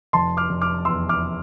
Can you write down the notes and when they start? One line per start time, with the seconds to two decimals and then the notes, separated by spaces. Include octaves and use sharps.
0.13 F1 A5 C6
0.37 D6 F6
0.49 F1
0.62 D6 F6
0.85 E2 C6 E6
1.09 D6 F6